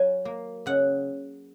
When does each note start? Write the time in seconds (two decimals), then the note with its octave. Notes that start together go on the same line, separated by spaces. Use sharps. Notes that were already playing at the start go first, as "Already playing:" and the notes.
Already playing: F#3 G#5
0.25 A#3
0.66 C#3 F#5